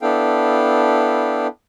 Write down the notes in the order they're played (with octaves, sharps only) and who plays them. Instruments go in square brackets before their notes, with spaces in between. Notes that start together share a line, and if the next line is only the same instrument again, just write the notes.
[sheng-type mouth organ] B3 D4 E4 A4 F5 G5